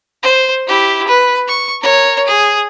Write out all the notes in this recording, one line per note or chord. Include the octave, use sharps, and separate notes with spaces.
C5
E4 G4
B4
C#6
A#4 C#5
G#4